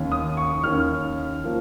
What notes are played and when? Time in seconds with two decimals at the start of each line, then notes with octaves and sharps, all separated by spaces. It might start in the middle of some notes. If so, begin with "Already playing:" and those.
Already playing: D#2 D#3 C#4
0.12 D#6
0.37 C#6
0.63 D#2 D#3 C#4 F6
1.44 F3 A#3